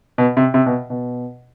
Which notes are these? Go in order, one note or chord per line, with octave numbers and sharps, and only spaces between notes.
B2
C3
C3
B2
B2